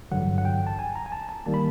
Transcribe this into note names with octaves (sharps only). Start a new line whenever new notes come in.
A1 G2 D3 F#3 F#5
F#5
G5
A5
G#5
A#5
G#5
A5
A5
D#3 G3 A#3 A5
B5